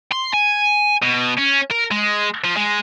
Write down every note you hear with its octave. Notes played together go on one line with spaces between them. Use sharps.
C6
G#5
B2
C#4
A#4
G#3
F3
G#3